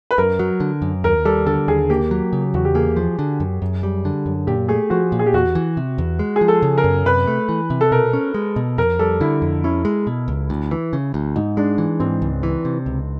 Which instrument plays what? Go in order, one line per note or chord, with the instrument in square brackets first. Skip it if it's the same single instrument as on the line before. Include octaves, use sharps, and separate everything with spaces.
[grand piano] B4
[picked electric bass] F#2 [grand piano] A#4
[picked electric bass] F#3
D3
F#2
[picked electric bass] D#2 [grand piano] A#4
[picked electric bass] G3 [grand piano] A4
[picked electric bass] D3 [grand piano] A4
[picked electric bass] D#2 [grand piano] G#4
[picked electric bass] A#3 [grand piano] G4
[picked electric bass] F#3
C#3
[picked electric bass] E2 [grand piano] F#4
[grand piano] G4
[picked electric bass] A#3 [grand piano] G#4
[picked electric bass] F3
D3
F#2
F#2
G3
D3
F#2
[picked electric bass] A#2 [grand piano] G4
[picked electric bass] A3 [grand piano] G#4
[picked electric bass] F3 [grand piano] F#4
[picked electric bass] A#2
[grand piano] G#4
G4
[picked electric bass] E2 [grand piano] F#4
[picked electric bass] E3
C3
E2
G#3
[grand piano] G#4
[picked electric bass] F3
[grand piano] A4
[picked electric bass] C#3
[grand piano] A#4
[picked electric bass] F#2
[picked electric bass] C3 [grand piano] B4
[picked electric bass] A3
E3
C3
[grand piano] A4
[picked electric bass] B2 [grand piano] A#4
[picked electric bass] C#4
G#3
B2
[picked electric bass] F2 [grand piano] A#4
[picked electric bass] G3 [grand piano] A4
[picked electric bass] D3 [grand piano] E4
[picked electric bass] F2
[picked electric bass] C#4 [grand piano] E4
[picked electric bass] G#3
B2
C#2
D2
E3
C#3
D2
[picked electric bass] G#2 [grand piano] D#4
[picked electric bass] G#3 [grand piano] D4
[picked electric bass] E3
[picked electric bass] G#2 [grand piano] C4
[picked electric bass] C#2
E3
C3
C#2